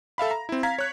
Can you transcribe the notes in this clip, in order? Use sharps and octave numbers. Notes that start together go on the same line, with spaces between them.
A4 E5 F5 B5
A#5
C4 E4
F5 A#5 G#6 B6
C#5 F#6